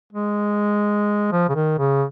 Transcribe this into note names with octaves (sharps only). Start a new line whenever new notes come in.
G#3
F3
C#3
D#3
C#3